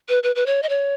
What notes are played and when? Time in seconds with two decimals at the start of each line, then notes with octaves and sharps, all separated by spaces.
0.09 B4
0.23 B4
0.36 B4
0.46 C#5
0.63 D#5
0.69 C#5